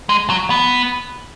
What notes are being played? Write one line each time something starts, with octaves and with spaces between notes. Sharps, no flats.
G#3
F#3
B3